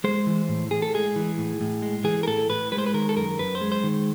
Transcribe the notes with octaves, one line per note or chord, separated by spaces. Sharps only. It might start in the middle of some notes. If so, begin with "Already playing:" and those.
G#3 C5
E3
A2
A2 G#4
A4
G#3 G#4
E3
A2
A2
G#3
E3 G#4
A#4
A2 A4
A2 B4
G#3 B4
C5
B4
D#3 A#4
A4
F#2 A#4
F#2 B4
C5
G#3
C5
D#3